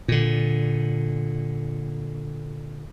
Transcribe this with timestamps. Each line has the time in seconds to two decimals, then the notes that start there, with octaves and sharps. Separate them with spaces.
0.08 A#2 D3